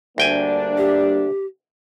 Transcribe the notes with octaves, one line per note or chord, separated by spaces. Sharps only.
D2 G3 A#3 D4 G5 G#5
G4